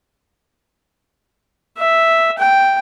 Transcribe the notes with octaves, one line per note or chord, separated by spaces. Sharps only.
E5
G5